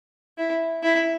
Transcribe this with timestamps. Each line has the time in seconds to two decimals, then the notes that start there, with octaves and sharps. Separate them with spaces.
0.38 E4
0.83 E4